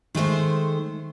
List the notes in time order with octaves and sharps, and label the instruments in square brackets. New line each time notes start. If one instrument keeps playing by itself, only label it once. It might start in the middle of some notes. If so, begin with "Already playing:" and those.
[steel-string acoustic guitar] D#3 G#3 A3 C5